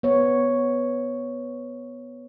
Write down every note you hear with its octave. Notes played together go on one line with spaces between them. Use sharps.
B3 C#5